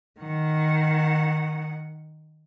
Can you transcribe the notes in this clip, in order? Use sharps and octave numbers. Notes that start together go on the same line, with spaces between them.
D#3 F#5